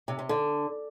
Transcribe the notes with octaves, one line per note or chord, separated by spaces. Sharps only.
C3
C3
D3